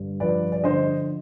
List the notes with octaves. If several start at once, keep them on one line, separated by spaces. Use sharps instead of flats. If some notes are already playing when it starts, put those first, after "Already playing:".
Already playing: G2 D3
F3 B4 D5
D5
D3 C5 D#5